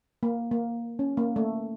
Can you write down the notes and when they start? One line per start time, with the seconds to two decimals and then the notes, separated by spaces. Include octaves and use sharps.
0.23 A#3
0.51 A#3
0.99 C#4
1.17 A#3
1.36 A3